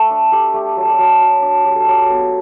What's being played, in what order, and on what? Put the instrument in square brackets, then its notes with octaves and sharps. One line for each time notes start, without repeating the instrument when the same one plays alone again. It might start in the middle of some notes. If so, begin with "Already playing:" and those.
Already playing: [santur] A3 A4
D4
A3 G4
A3 G4
F#3 A4
G4
F#3 A4
F#3
D4
F#3 G4
A4
F#3 G4
B3